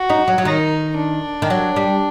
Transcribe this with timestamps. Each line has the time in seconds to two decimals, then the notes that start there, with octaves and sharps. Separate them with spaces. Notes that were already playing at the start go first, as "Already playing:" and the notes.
Already playing: F#4
0.10 D#4
0.28 F#3
0.38 F#3
0.45 D#3 D#4
0.97 D4
1.42 D#3
1.50 F#3
1.76 G3